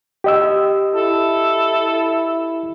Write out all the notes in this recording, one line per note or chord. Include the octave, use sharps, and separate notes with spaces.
G4 D#5 E6
E4 A4